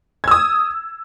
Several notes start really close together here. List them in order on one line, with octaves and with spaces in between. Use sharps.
G#6 E6 D#6